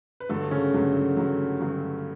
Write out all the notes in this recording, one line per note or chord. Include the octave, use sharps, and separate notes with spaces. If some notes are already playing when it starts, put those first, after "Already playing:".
B4
G2 D3 F#3 A3 A4
C#3 C#4
G2 D3 F#3
G2 D3 F#3
G2 D3 F#3